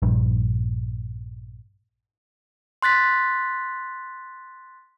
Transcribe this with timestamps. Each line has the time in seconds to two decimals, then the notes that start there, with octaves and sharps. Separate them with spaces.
0.02 A#1 G2
2.82 C6 F#6 A6 B6